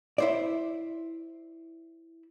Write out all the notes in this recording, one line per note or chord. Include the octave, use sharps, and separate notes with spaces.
E4 C5 D5